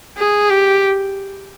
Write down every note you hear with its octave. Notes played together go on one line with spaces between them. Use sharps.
G#4
G4